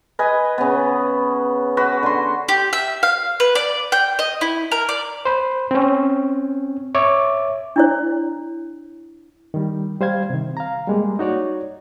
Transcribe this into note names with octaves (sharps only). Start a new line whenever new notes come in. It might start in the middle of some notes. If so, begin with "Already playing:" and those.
B4 D#5 G#5
C#3 B3
F#4 B4
D3 C6
G4
E5
F5
B4
D5
G5
D#5
E4
A#4
D5
C5 B5
C4 C#4
C#5 E5 D6
D4 E4 C#5
D#3 G3
G3 C5 F5 G#6
C3 D#3
F5 A#5
G3 G#3 A#3
D#4 F#4 C#5 D5